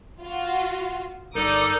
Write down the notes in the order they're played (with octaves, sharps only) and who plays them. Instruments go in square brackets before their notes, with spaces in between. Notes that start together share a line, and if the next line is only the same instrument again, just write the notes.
[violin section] F4 F#4
[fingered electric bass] G1 [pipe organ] D#4 A4 [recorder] A#4 [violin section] D5 D6 D#6